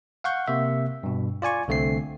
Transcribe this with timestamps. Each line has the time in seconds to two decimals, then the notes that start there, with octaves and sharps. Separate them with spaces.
0.24 F5 F#5 C#6 G6
0.48 C3 A#3 E5
1.03 G2 B2
1.42 F4 D5 G#5 C#6
1.68 C2 D3 A3 C4 C7